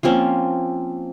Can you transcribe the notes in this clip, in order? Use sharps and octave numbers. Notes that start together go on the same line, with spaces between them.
F3 A#3 C4 C#4